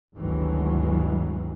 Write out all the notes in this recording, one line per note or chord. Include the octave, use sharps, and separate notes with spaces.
G1 D2 D#3 E3 F#3 G#3